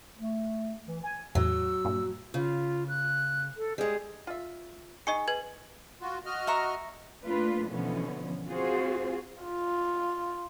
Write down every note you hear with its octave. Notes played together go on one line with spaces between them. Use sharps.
A3
E3
G#5
E2 A2 F#3 E6
G2 A#2
C#3 F4
F#6
A4
G3 G#3 G#4
F4 E5
D#4 G#4 D#5 C#6 C#7
G#4 B4 G#6
F4 F#4
F#4 D#5 F6
E5 A#5 C#6
A3 A#3 D4 F4 B4
B2 D3 E3 F3 B3 C#4
C4 F4 F#4 G#4 C5
F4